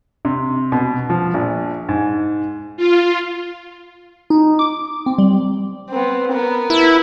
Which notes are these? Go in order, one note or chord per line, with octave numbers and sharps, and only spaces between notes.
C3
B2
F3
A#1
G#2
F4
D#4
D6
C4
G3
B3 C4
B3 A#4
E4